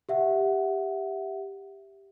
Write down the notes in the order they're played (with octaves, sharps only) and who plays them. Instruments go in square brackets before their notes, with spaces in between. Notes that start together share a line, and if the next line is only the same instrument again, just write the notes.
[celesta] G4 E5 F#5